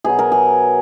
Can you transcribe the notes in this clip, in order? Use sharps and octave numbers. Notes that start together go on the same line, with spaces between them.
B2 F#3 G#4
A#4
G#4